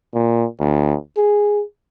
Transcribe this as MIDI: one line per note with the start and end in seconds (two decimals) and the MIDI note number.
0.14 0.45 46
0.60 0.96 38
1.17 1.63 68